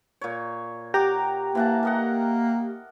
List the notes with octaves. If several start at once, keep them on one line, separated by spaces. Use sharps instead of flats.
A#2 C#5
G4 F#5 G5 A#5 D6
E3 A#3 F#5 A5
A#4 D#5 F#5